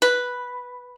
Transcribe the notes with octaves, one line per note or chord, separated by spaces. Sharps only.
B4